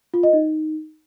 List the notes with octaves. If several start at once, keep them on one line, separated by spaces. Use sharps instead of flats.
F4
D#5
D#4